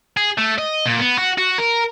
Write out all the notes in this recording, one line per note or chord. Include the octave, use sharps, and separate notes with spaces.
G#4
A3
D#5
A#2
B3
F#4
F#4
A#4